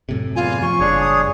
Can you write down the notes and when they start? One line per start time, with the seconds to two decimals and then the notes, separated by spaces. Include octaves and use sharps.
0.09 F#2 A2 C3
0.36 E2 F4 G#5
0.62 F3 C#6
0.80 F#1 G2 D4 G#4 C#5
1.00 D#6